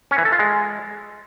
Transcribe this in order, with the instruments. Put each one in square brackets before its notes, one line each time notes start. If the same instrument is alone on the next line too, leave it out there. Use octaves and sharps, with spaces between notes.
[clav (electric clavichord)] C#4
E3
A4
F4
G#3